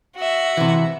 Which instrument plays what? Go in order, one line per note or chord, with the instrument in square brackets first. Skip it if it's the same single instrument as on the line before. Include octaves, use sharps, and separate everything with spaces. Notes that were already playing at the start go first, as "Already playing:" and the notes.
[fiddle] F#4 E5
[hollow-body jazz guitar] C3 E3